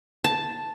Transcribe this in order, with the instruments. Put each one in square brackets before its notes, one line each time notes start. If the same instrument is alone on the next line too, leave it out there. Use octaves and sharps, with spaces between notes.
[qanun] A5